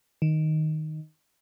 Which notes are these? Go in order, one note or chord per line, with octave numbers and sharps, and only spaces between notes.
D#3